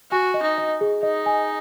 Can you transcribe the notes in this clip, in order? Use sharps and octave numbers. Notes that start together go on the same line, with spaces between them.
F#4 G#5
D#5
D#4
D#5
G#4
D#4 D#5
G#5